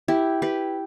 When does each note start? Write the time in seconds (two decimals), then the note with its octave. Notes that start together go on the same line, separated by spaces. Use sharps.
0.08 E4 G4
0.42 G4 B4